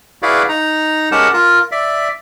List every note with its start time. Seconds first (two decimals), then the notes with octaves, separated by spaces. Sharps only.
0.23 E4 F#4 G#4 B4 D5 F5
0.49 D#4 A#5
1.12 G#3 C#4 G4 A#4 F#5 A5
1.34 F4 A#4
1.72 D5 E5